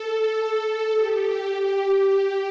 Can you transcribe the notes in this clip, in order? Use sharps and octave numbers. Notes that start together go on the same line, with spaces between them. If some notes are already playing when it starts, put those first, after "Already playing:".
Already playing: A4
G4
G4